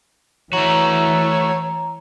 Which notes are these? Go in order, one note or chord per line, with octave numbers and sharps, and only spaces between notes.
E3 A3 F#4 C#5 A#5